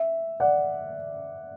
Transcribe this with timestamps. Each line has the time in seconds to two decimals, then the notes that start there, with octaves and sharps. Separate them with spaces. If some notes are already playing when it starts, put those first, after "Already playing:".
Already playing: E5
0.40 D5 F#5